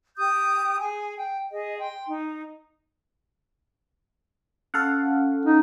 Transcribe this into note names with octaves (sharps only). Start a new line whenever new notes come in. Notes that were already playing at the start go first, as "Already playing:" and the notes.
G4 D#6 G6
G#4 G#5
G5
G#4 D#5
G5 C6
D#4
C#4 A4 F5 F#5
D#4